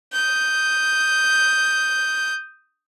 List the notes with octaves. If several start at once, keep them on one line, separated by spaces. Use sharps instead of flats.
D#6 G6